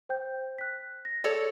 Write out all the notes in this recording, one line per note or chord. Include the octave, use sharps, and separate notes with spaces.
C5 G5 G6
F#6 B6
A#6
A4 C#5 D5